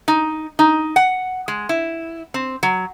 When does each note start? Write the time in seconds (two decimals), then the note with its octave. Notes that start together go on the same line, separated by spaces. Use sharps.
0.08 D#4
0.59 D#4
0.96 F#5
1.48 G#3
1.69 E4
2.34 C4
2.63 F#3